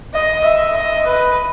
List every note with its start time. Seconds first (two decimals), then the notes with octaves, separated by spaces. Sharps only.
0.14 D#5
0.44 E5
0.75 D#5
1.06 B4